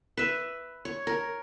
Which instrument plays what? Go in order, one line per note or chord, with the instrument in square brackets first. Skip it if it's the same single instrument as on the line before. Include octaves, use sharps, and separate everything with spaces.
[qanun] B4 E5
C#5
A#4